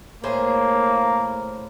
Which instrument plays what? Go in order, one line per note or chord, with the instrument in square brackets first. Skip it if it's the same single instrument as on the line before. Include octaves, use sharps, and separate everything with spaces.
[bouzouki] A2 G#4 C5 [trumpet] A#3